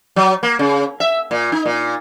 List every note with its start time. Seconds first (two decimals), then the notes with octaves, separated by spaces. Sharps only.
0.16 F#3
0.43 A#3
0.59 C#3
1.00 E5
1.31 A#2
1.52 D#4
1.66 A#2